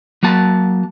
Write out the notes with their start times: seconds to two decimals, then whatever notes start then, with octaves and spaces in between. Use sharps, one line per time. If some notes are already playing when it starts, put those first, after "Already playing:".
0.23 F#3 A#3 F#4 A5